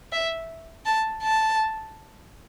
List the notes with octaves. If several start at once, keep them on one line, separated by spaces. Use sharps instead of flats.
E5
A5
A5